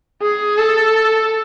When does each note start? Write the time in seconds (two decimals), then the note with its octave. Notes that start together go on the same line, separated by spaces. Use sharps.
0.22 G#4
0.58 A4